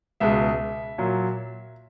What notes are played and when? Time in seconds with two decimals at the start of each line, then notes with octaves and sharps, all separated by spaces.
0.20 C#2 B2 G#3 E5
0.98 A#2 F#3